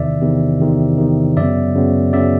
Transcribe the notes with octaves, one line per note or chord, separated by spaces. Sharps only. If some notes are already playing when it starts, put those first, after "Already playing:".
Already playing: E2 C3 D#3 D5 E5
E2 C3 D#3
E2 C3 D#3
E2 C3 D#3
F#2 C#3 F#3 B3 D5 E5
F#2 C#3 F#3 B3
F#2 C#3 F#3 B3 D5 E5